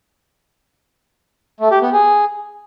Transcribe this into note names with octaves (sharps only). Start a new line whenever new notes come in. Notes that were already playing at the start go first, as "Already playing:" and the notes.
A3
G4
B3
G#4